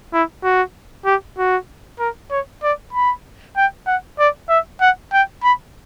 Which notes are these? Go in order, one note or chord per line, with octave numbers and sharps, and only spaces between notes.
E4
F#4
G4
F#4
A#4
C#5
D5
B5
G5
F#5
D5
E5
F#5
G5
B5